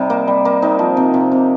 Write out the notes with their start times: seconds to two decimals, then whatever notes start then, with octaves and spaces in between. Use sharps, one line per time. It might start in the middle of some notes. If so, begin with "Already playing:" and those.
Already playing: C3 G3 D#4
0.10 A#3
0.28 G3
0.45 A#3
0.62 C3 D#4
0.79 F3
0.97 C3
1.14 C3
1.32 C3